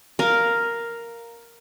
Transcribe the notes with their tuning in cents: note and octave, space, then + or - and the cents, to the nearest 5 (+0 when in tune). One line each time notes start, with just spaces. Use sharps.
A#4 +0 F5 +0